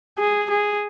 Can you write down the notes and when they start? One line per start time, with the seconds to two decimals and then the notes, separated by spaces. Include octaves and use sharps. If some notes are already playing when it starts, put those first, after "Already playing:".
0.19 G#4
0.50 G#4